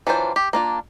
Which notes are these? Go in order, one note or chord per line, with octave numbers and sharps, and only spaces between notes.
E3 F#3 D4 F4 C5
G4
A#3 D4 F4